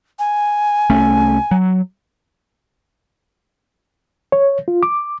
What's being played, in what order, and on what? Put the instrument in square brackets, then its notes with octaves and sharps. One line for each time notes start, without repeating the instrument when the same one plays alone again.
[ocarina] G#5
[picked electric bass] C2 A3 C#4
F#3
[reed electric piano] C#5
F4
D6